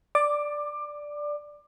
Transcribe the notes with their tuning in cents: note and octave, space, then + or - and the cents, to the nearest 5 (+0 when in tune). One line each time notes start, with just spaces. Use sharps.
D5 +0 D6 +20